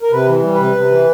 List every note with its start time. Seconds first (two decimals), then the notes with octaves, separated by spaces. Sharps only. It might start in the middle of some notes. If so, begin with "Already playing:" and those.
0.02 A#4
0.12 C3 B4
0.28 E3
0.43 G3
0.54 B4
0.59 C3
0.76 C3
0.91 E3